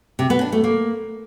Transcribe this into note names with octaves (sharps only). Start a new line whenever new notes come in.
C3
B3
D4
A3
A#3